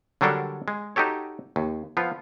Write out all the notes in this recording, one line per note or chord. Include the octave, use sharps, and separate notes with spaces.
D3 F#3 G3 D4 A4 A#4
G#3
D#4 F#4 G4 A4 C#5
D#2
F3 B3 F4